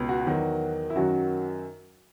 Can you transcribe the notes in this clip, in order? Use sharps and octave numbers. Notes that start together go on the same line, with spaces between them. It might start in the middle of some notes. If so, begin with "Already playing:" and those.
Already playing: C#2 B2
F#4
E2 D#3 F#3
E4
F#2 D#3 F#3 F#4